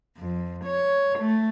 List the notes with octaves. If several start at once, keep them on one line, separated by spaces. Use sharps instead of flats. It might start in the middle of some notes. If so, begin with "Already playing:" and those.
F2
C#5
A3